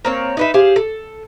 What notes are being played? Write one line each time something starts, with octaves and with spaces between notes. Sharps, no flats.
A#3 C4 C#5
D#4 B4 E5
G4 G#4 C5 F5
A4